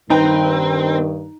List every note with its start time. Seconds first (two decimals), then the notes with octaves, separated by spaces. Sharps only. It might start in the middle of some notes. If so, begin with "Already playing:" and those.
0.10 G2 D#3 C4 D#4 B4 G5 A#5